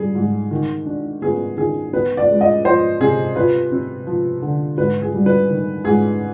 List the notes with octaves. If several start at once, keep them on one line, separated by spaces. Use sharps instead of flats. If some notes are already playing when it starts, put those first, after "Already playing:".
Already playing: G3 G#4
G#2
D#3
D4
B3 G#4
D#3 G#4
B3 B4
D5
G#3
D#5
F3 C5
C3 G#4
F4 B4
C4
F3
D3
G#2 B4
G#4
G3
B4
D#3
G#2 G#4